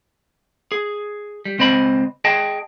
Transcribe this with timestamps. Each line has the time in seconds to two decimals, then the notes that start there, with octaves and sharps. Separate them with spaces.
0.72 G#4
1.45 G3
1.59 C#2 C4 C5 D#5 B5
2.25 G#4 D#5 G5 A5